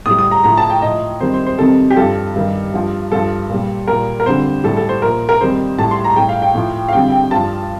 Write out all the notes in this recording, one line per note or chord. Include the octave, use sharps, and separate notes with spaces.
A2 G3 D#6
D#6
A#5
A2 F3 A#5
A5
G5
A2 F3 D#5
F2 D#3 G3 C5
C5
C5
F2 C3 D#3 G3 A4
G4
G2 F3 A4
G2 D#3 G3
G2 F3
G2 F3 A4
A#2 G3
A#2 G3 A#4
A#4
F2 D3 G3 C5
A2 G3 A4
A4
C5
A#2 F3 A#4
A#4
F2 D#3 G3 C5
A2 G3 A5
C6
A#5
A2 G3 G5
F5
G5
A2 F3
F5
F2 D3 G3 G5
G5
G2 F3 A5